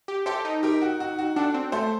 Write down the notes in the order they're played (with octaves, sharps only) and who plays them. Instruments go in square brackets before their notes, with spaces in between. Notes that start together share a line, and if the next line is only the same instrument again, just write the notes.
[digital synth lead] G4
[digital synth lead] G4 [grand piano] A4 C5
[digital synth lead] D#4
[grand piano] G4 A#4
F#4
F#4
F#4
[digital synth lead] D4 [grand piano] F#4 A4
[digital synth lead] C4
[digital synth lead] A3 [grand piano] A4 C5